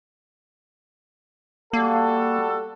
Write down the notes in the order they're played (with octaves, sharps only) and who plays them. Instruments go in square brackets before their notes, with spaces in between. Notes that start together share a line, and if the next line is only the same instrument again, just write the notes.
[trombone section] G3 F#4 A4 [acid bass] A#3